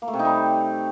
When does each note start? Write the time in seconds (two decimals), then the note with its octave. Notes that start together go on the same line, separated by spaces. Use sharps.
0.02 A#3
0.08 A3
0.14 C3
0.19 D#4
0.25 G3